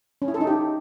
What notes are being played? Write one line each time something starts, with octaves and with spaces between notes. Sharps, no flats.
C#4
E4
A4
D#4
G4